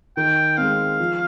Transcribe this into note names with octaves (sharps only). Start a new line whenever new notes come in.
D#3 G5
G#3 C4 F5
F3